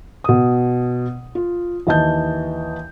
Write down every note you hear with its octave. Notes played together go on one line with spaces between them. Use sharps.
B2 D#6
F4
D#2 E3 D#5 A5 G6